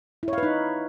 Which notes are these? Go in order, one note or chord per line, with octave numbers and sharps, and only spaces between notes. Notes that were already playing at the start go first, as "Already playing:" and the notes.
D#4 E4 B4 C#5 F5